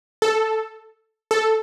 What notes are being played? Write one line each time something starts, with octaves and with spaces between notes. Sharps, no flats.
A4
A4